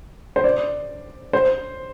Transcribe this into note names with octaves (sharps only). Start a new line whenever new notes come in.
C5
D5
C5